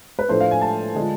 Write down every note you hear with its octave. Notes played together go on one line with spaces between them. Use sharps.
B4
A2 F3 A3 D4 C5
F5
G#5
A5
D3 G#3 D4 F4